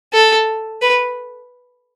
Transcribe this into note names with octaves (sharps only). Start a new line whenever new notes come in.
A4
B4